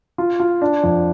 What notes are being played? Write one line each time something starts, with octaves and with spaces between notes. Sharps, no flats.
F4
F4
D4
F2